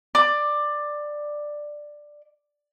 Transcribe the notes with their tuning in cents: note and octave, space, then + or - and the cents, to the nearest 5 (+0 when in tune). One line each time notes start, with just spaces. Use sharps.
D5 +10